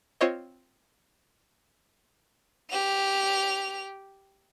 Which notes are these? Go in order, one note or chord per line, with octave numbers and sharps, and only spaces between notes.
C4 F4 C5 C#5 D#5
G4 F7